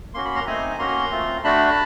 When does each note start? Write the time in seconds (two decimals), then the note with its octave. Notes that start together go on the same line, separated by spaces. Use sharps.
0.14 A#3 C#4 F#4 C6
0.25 B5
0.35 A#5 C6
0.46 A3 C4 D#4 G#5 A#5
0.78 A#3 C#4 F#4 A#5 C6
1.11 A3 C4 F4
1.44 A3 D4 F#4 A5 B5